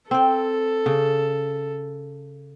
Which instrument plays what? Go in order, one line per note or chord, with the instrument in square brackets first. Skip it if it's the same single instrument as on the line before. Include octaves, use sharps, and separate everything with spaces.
[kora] C4 G5 [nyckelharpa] A4
[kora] C#3